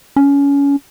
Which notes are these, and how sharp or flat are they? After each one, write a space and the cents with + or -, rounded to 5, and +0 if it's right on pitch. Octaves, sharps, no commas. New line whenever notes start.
C#4 +25